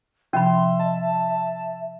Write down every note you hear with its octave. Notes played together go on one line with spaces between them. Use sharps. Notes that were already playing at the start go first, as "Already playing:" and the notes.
C3 F3 C#4 E5 B5 C6
D#5 A5